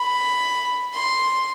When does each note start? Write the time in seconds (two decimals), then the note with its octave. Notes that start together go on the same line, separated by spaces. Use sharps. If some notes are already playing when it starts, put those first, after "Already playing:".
Already playing: B5
0.95 C6